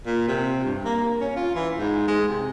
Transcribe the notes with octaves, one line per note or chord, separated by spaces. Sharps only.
A#2
C3
G2
A#3
C#4
F4
E3
G#2
G#3
C3